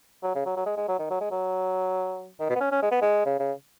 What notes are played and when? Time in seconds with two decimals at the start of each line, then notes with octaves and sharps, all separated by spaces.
0.23 F#3
0.35 C#3
0.46 F#3
0.56 F#3
0.66 G#3
0.77 G#3
0.88 F#3
0.99 D#3
1.10 F#3
1.20 G#3
1.31 F#3
2.40 D#3
2.49 B2
2.56 B3
2.60 C#4
2.72 C#4
2.82 G#3
2.91 B3
3.01 G#3
3.25 C#3
3.39 C#3